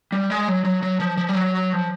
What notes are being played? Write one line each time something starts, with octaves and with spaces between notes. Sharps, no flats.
G3
G#3
F#3
F#3
F#3
F3
F3
G3
F#3
F3